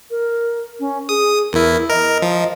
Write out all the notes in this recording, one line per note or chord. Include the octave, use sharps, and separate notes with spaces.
A#4
C#4
G#4 D#6
E2 E4 A#4
A#4 D#5
F3